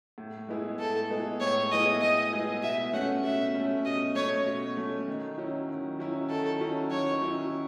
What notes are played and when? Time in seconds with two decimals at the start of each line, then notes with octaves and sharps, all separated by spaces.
0.18 A2
0.49 G#3 B3 E4 G#4
0.79 A2 A4
1.10 G#3 B3 E4 G#4
1.40 A2 C#5
1.71 G#3 B3 E4 G#4 D#5
2.01 A2 D#5
2.33 G#3 B3 E4 G#4
2.62 B2 E5
2.93 A3 C#4 F#5
3.24 B2 E5
3.55 A3 C#4
3.85 B2 D#5
4.15 A3 C#4 C#5
4.47 B2
4.77 A3 C#4
5.08 D#3
5.38 F#3 C#4 E4
5.69 D#3
5.99 F#3 C#4 E4
6.30 D#3 A4
6.61 F#3 C#4 E4
6.91 D#3 C#5
7.22 F#3 C#4 E4